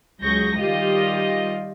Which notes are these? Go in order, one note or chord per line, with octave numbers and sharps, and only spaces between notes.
C#2 F#3 G#4 C#6 G6 A#6
D#3 G3 F4 G4 D#5